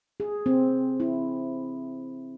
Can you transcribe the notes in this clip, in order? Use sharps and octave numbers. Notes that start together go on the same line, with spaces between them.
G#4
C4
E4